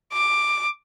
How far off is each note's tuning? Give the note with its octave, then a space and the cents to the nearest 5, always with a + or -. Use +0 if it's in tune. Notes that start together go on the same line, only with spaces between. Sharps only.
D6 +10